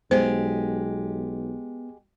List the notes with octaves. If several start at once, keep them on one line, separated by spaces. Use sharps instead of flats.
B1 G#3 B3 G4 C5